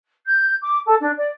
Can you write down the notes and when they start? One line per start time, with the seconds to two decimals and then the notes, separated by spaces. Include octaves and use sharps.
0.25 G6
0.63 D6
0.85 A4
1.01 D4
1.16 D5